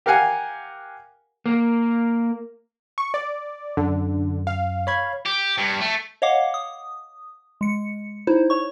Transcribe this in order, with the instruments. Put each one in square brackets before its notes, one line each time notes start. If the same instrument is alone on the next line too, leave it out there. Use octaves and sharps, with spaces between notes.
[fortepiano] G4 A#4 F5 F#5 G#5
[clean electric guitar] A#3
[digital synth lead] C#6
D5
[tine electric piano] F#2 [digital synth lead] D3
[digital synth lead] F5
[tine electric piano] C#5 B5 G#6
[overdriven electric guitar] G4
G2
A3
[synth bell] C#5 D#5 F5 F#5 D6
D#6
G#3 C#7
D#4 E4 C5
C#5 C#6